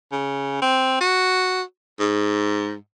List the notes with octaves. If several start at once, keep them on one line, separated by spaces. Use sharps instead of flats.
C#3
C4
F#4
G#2